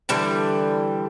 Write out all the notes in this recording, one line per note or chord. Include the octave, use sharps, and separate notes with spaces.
D3 E3 G3